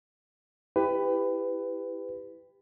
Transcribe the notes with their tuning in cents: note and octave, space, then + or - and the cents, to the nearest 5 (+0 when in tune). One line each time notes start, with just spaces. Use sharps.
E4 +0 G4 +15 B4 +20